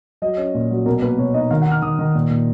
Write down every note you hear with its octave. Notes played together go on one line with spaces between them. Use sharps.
F#3 D#5
C#4
A#2
F#3
B2 A#4
A#3 B4
B2 C#5
D#4 D#5
D#3 F5
F#5
D#4
F6
D#3 D#6
D#3
A#2
A#2